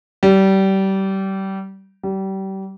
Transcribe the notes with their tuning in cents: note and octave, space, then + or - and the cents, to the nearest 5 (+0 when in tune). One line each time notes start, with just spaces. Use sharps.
G3 -25
G3 -30